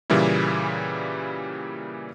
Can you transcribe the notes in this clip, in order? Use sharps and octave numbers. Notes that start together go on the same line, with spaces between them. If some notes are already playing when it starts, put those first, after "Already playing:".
A#2 C#3 E3 G3 A#3 E4